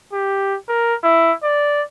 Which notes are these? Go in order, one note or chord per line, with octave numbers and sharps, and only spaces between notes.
G4
A#4
E4
D5